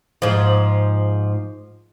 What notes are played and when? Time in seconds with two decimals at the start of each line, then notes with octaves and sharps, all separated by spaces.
0.22 G#2 F3